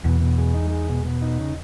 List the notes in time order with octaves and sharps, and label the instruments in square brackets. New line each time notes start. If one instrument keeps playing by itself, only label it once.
[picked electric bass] E2 [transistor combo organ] B2
[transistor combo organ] B2
G#3
D#4
G#3
B2
B2
D#4
C#3